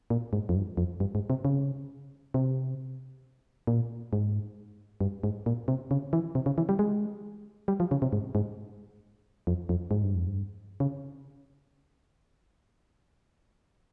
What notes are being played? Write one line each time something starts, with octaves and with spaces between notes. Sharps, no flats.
A#2
G#2
F2
G2
F2
G2
G#2
C3
C#3
C3
A#2
G#2
G2
G#2
A#2
C3
C#3
E3
C3
C#3
E3
G3
G#3
G3
F3
C#3
C3
G#2
G#2
F2
F2
G#2
G2
F2
G2
C#3